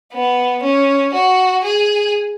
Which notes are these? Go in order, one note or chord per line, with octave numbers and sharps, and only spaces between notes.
B3
C#4
F#4
G#4